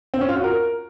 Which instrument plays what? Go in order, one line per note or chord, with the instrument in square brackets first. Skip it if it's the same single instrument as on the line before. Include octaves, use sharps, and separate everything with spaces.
[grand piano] C4
C#4
F4
F#4
A#4